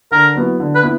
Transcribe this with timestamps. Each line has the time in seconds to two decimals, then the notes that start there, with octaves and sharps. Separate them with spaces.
0.12 D3 A#4
0.36 F#3 B3 E4
0.60 D3
0.75 B4
0.83 B3 E4